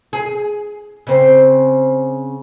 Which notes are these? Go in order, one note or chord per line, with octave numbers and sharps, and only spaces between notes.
G#4
C#3 C4